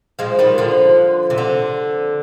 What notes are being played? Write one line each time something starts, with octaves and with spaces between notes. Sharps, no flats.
F3 G#3
D#3 G3
D3 F3
C3
D3